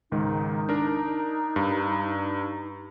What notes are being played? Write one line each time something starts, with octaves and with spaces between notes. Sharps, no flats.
C#2 G#2 D#3 D#4
D4 A#4
G2